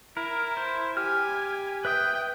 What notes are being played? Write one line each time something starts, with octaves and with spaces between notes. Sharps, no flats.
E4 A#4
C5
G4 G#5 F6
B4 E5 G5 D#6